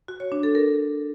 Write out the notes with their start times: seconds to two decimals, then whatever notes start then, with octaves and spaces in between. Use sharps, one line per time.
0.08 F#4
0.20 C#5
0.32 D4
0.43 A4
0.55 A#4